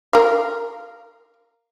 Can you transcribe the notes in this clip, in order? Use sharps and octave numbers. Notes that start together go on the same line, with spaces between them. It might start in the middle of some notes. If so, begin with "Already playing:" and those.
A#4 F5